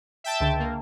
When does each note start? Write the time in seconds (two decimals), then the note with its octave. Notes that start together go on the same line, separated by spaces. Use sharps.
0.24 E5 G5 A5
0.41 C#2 D3
0.60 A#3